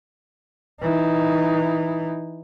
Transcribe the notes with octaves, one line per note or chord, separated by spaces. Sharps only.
E3 D#4